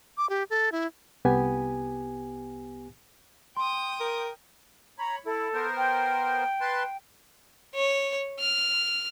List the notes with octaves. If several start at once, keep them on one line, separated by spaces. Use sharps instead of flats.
D6
G4
A4
E4
C2 B3 G4 G#5
G5 C6 D#6
A#4
C#5 A#5 B5
E4 A4
B3 A#4 C5
G5
B4 A5 C6
C#5
F6